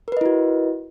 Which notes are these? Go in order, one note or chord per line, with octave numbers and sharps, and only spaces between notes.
E4 F#4 A#4 B4 D#5